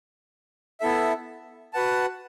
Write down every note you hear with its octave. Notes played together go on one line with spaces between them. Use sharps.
B3 E4 A4 E5
F#4 B4 F#5 A5